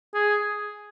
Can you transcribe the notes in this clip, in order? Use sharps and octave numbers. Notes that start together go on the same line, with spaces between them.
G#4